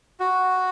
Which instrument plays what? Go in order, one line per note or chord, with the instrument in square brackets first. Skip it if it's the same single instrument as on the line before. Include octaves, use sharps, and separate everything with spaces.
[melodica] F#4